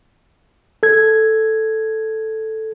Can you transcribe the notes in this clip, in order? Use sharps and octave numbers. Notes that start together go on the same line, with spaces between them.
A4 G#6